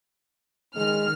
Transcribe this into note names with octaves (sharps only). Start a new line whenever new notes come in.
D#3 G#3 F6